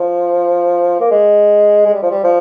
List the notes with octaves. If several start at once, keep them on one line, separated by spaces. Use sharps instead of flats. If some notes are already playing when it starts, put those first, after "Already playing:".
Already playing: F3
A#3
G#3
G#3
G3
F3
G3
F3